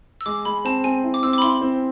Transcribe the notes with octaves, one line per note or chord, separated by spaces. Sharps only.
E6
G#3 D6
G#3 B5
C4 A5
C4 G#5
E4
D6
C4 E6
D6
B5
E4 C6
C4